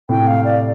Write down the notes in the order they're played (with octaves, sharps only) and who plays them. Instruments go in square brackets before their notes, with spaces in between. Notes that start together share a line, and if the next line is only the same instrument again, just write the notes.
[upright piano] A2 C3 [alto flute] G5
[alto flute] F5
D5